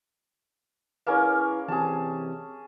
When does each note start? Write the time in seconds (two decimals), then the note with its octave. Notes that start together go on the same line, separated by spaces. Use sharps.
1.07 A#3 C#4 E4 G#4 B4
1.68 E3 C4 G4 G#4 A5